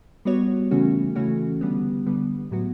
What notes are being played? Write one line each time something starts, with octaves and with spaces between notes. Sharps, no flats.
G3 B3 F#4 C#5
C#3 E3 A3 C#4 F#4
C#3 E3 A3 C#4 F#4
D3 G3 B3
D3 G3 B3
A2 F#3 B3 F#4